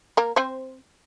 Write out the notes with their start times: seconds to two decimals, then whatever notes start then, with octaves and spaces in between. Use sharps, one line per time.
0.17 A#3 A#4
0.36 C4 C5